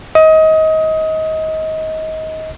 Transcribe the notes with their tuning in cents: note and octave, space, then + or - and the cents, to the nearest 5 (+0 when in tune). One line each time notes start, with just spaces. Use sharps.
D#5 +25